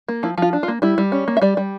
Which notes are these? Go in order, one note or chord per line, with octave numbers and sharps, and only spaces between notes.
A#3
F3 E4
F3 F4
D4
F4
A#3
G3 E4
G3
C#4
A#3
E5
G3 D5
G3